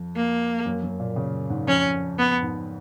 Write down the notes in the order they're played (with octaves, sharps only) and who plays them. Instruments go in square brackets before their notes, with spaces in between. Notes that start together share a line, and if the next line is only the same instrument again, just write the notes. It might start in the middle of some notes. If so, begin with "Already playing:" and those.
Already playing: [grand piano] F2
[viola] A#3
[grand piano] F#2
F#2
A#2
C#3
G#2
[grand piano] F2 [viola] C#4
[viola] B3
[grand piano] G#2